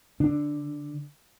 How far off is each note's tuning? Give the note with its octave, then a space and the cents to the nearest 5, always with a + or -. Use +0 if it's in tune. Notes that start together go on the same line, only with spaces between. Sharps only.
D3 +0 D4 +0